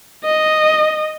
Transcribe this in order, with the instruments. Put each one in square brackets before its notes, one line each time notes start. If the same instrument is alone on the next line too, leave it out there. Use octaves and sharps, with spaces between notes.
[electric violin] D#5